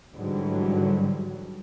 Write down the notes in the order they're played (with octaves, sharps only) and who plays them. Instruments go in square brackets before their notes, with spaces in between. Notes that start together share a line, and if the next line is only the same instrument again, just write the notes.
[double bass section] G#2 D3 E3 F#3 G3